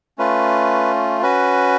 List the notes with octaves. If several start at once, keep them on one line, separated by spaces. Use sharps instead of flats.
A3 C#4 F4 B4
C#4 F#4 B4